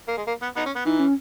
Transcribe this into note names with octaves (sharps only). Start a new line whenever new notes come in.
A#3
G#3
A#3
B3
B3 D#4
C#4
B3
E3 D#4
C#4